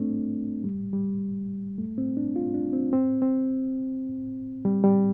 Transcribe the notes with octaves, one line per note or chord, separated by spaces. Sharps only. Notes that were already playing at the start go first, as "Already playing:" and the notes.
Already playing: A3 C4 D4
G3
G3
A3
C4
D4
F4
D4
C4
C4
C4
G3
G3